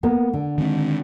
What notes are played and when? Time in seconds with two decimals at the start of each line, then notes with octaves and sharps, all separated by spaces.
0.03 A#3 B3
0.33 D3
0.58 D#3 G#3 C4